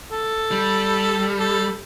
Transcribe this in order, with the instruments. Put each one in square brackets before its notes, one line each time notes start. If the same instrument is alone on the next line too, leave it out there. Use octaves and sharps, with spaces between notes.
[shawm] A4
[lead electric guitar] G3
[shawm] A4